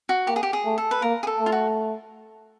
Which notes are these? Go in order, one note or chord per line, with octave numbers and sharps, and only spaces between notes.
F#4
A#3 G4
G#4
G4
G#4
A3
A4
B4
A#3 A#4
G#4
A4
A3
F4
F#4